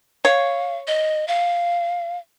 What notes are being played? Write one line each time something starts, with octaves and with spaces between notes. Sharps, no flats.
C#5 F5
D#5
F5